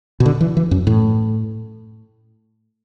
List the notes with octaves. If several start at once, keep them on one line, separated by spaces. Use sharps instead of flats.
B2
D3
E3
E3
F#2
A2